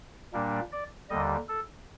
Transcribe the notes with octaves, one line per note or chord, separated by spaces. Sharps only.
A#2 G3 A#3 D4
D5
D#2 D3 G3 D#5
A4